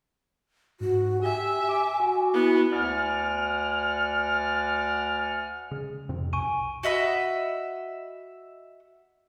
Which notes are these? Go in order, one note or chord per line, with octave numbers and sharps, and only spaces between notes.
G#2 F#4
G4 E5 G#5
D6
F#4
B3 E4
D2 D5 F#5 G#5 F6
C#3 G#3
F2 G#2 C3 C4
B1 B2 G#5 C#6 D#7
F#4 D#5 E5 B5